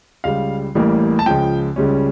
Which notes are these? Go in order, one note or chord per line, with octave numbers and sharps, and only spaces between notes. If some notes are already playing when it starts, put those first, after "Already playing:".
C#2 C#3 G3 F5
A1 A2 E3 G3 A#3
A5
C#2 C#3 F3 G5
C#2 C#3 G3 C#4